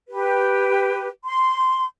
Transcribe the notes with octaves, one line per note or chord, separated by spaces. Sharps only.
G4 B4
C6